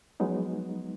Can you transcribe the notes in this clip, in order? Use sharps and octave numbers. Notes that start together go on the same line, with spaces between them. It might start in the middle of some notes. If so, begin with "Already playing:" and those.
F3 F#3 G#3 B3 D#4